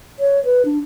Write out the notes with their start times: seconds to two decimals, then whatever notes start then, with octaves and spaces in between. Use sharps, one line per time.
0.19 C#5
0.45 B4
0.65 D4